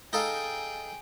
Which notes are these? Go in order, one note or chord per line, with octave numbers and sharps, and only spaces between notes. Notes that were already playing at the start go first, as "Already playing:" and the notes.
D#4 G#4 A4 F5 G5